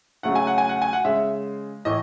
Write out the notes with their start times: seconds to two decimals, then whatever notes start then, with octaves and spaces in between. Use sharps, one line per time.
0.23 C#3 F#3 A3 F#5
0.35 G#5
0.47 F#5
0.58 G#5
0.69 F#5
0.82 G#5
0.93 F#5
1.05 C#3 G#3 E5
1.85 A2 E3 A3 D#5